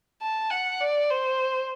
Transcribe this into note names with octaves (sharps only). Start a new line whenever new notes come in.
A5
F#5
D5
C5